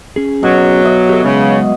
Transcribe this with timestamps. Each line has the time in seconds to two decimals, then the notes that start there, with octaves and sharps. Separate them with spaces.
0.16 C#4 G#4
0.43 B2 F#3
0.82 D#5 E5
1.09 G4 A4
1.24 C#3 F#3 G#3 B4